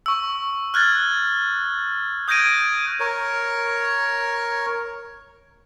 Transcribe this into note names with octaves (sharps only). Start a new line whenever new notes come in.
C#6 E6
F6 F#6 G#6 A6
D#6 G6 G#6 A#6 D7 D#7
A#4 C#5